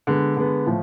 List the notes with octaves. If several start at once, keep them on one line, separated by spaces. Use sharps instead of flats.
D3 G#3 B3
D3 G#3 B3
A2 F3